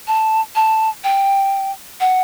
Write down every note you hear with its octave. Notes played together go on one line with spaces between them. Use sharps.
A5
A5
G5
F#5